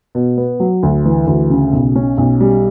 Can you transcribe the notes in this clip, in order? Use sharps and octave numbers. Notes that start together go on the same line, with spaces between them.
B2
B3
F#3
D2
E3
D2
C#3
B1
C#4
B1
G3